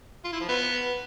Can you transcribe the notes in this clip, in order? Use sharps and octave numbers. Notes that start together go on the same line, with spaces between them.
F4
E4
F3
B3